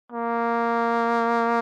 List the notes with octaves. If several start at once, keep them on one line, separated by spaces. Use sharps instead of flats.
A#3